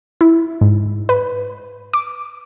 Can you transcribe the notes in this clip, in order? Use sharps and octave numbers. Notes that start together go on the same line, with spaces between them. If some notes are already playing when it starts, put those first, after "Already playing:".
E4
G#2
B4
D6